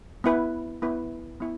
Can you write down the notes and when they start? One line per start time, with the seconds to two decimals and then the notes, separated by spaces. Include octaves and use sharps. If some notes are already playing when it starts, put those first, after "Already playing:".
0.24 B3 E4 B4
0.82 B3 E4 B4
1.40 B3 E4